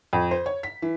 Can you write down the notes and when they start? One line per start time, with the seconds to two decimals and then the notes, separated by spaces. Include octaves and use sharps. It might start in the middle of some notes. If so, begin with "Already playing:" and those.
0.13 F2
0.31 C5
0.46 C#5
0.63 B6
0.82 E3